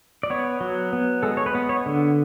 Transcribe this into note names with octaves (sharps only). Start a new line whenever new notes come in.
D5
B3 C#5
F#3
B3
G#3 A4
C#5
B4
B3
C#5
D3